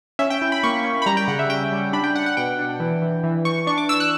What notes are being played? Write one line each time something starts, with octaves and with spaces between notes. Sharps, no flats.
C#4 E5
G5
E4
B5
A#3 C#6
C#4
B5
G3 A#5
G5
C#3 F#5
E5
C#4 G5
G3
D4 B5
G5
D4 F#5
F#5
B2 G5
D4
E3
E3
E3
E3 C#6
D4 C#6
D6
D4 E6
F#6